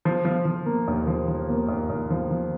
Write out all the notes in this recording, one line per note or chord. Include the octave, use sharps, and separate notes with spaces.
F3
F3
F3
A#3
D#2
F3
F3
A#3
D#2
D#2
F3
F3